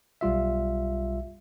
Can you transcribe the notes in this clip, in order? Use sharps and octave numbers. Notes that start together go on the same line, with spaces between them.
B1 G3 F4 E5